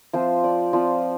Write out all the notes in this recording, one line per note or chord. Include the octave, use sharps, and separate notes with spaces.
F3 C4 F4 C5
D5
F3 C4 F4 D5